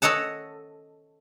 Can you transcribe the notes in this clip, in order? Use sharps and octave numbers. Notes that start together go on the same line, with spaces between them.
A4 C#5 D#5 F#5 A5